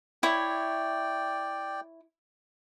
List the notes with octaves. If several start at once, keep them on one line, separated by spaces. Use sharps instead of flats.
E4 C#5 D5 G5